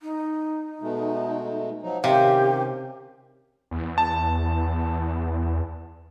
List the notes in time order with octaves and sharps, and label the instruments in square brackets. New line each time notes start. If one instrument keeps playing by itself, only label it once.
[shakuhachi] D#4
[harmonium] B2 G#3 A3
F3 F#3 D#4
[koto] C3 [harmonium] D#3 C#4 [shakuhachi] G4 [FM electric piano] F5
[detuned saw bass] E2
[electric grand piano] A5